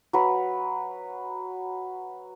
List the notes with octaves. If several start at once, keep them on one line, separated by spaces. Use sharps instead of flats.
F#3 B4